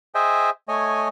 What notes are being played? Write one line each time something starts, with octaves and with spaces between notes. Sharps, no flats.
G#4 C5 D#5 E5 G5 G#5
A3 C#5 D#5 G#5